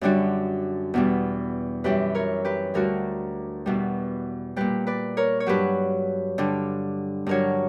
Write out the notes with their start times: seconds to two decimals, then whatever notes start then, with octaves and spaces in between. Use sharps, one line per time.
0.01 F#2 D3 G3 D4 F#4
0.94 E2 B2 G3
1.84 F#2 E3 G3 G4 B4
2.15 A#4 C#5
2.45 G4 B4
2.74 D2 D3 G3 F#4 A#4
3.66 E2 B2 G3
4.56 A#2 G3 G4 B4
4.87 B4 D5
5.17 A#4 C#5
5.40 C#5
5.46 G2 F#3 G4 B4
6.38 G2 D3 G3
7.26 G2 D3 F#3 A#4 C#5